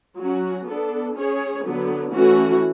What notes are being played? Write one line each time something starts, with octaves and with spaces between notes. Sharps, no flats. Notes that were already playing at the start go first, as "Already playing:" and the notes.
F#3 C#4 F#4
B3 D4 A4
C#4 G#4 C#5
D3 F#3 B3
E3 A3 C#4 F#4